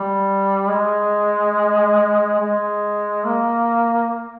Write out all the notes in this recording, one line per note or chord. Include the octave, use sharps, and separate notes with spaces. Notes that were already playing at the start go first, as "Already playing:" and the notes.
Already playing: G3
G#3
G#3
A#3